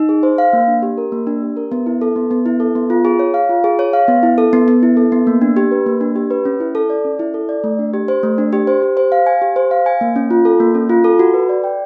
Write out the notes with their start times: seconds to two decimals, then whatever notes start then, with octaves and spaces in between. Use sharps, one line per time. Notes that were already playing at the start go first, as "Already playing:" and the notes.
Already playing: D#4
0.09 G#4
0.23 C5
0.38 F5
0.53 A#3
0.68 D4
0.83 G4
0.98 A#4
1.12 A#3
1.27 D4
1.42 G4
1.57 A#4
1.72 B3
1.86 E4
2.01 A4
2.16 B3
2.31 B3
2.46 E4
2.60 A4
2.75 B3
2.90 F4
3.05 G#4
3.19 C#5
3.34 F5
3.49 F4
3.64 G#4
3.79 C#5
3.93 F5
4.08 B3
4.23 E4
4.38 A4
4.53 B3
4.68 B3
4.83 E4
4.97 A4
5.12 B3
5.27 A#3
5.41 D4
5.57 G4
5.71 B4
5.86 A#3
6.01 D4
6.16 G4
6.30 B4
6.45 C#4
6.60 E4
6.75 A4
6.90 D5
7.05 C#4
7.19 E4
7.34 A4
7.49 D5
7.64 A3
7.79 D4
7.94 G4
8.08 C5
8.23 A3
8.38 D4
8.53 G4
8.67 C5
8.82 G4
8.97 C5
9.12 F5
9.26 G#5
9.42 G4
9.56 C5
9.71 F5
9.86 G#5
10.01 A#3
10.16 C#4
10.30 F4
10.45 A4
10.60 A#3
10.75 C#4
10.89 F4
11.04 A4
11.19 F#4
11.34 B4
11.49 D5
11.64 G5